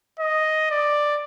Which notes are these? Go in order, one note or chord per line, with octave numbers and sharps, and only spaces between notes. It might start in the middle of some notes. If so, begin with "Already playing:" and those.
D#5
D5